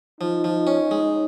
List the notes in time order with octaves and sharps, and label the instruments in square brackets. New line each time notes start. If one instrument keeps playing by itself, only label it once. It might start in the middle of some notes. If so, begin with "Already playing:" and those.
[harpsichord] F3 [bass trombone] D#4
[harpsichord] F3
C#4
G#3